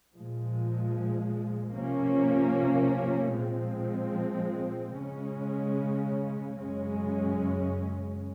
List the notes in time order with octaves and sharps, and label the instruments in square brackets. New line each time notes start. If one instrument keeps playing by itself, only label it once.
[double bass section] A#2 F3 G#3
C3 F3 A#3 C#4
A#2 F3 G#3 C4
C#3 G#3 C#4
F#2 C#3 G#3 C#4